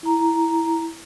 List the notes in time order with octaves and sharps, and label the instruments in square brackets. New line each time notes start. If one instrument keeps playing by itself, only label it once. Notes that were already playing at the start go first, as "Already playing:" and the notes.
[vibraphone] E4 A#5